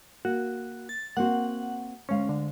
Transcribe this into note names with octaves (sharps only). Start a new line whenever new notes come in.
A#3 F#4
A6
A#3 C4 F#4 F#5
D2 G#3 C#4 F5
D3